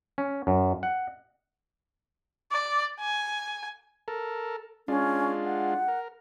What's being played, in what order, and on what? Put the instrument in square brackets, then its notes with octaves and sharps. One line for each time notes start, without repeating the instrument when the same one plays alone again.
[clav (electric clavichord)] C#4
F#2
F#5
[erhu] D5
G#5
[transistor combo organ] A4 A#4
[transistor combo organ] G#3 D4 F4 [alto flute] C#4
[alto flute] F#5
[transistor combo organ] A#4